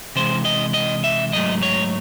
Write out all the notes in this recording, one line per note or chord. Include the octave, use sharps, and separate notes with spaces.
C3 E3 G#3 C5
D#5
D#5
E5
G#2 F#3 A3 D#5
C#5